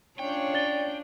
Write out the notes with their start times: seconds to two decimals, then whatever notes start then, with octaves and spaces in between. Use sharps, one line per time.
0.19 C#4 D4 F4 C#5 G5
0.54 D5 A6 G7